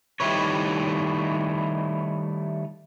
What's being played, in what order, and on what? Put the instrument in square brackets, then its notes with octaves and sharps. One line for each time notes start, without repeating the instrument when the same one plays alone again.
[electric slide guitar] D#3 G3 A3 E4 B4 C#5